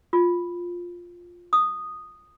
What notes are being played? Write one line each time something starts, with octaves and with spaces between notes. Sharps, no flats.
F4
D#6